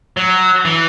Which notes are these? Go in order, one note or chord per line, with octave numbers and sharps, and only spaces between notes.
F#3
E3